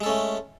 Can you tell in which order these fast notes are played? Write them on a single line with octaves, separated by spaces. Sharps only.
G#3 A4 C#4 A3